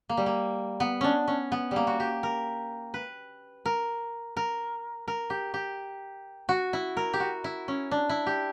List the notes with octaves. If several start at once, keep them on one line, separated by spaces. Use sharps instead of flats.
A#3
G3
A#3
B3
C#4 D4
C#4
B3
G3 A#3
F#4
G4
A#4
B4
A#4
A#4
A#4
G4
G4
F#4
E4
A#4
G4
F#4
E4
C#4
D4
E4
G4